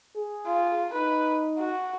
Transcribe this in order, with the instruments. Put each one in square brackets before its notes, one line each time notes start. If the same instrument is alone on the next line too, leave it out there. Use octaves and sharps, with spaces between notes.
[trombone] G#4
[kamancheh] F4
[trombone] D#4 [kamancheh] B4
[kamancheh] F#4